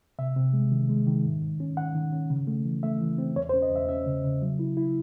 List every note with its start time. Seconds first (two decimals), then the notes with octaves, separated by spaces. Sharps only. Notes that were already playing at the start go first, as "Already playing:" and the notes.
0.19 C3 E5
0.36 C3
0.53 G#3
0.72 D#3
0.90 G#3
1.07 D#3
1.25 G#2
1.42 G#2
1.60 C#4
1.77 D#3 F#5
1.95 D#3
2.13 C#4
2.30 C#3
2.47 A3
2.65 E3
2.83 A3 E5
3.01 E3
3.18 C4
3.36 E2 C#5
3.49 C5
3.54 C#4
3.62 D#5
3.72 E2 E5
3.89 C#4 E5
4.07 C#3
4.24 C#3
4.42 F#3
4.59 E4
4.77 E4